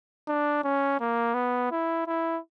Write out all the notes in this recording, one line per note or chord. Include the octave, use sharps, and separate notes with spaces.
D4
C#4
A#3
B3
E4
E4